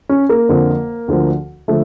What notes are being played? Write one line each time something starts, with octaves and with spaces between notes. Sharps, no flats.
C#4
A#3
F2 D3 F3
D2 D3 F3
D3 F3 A3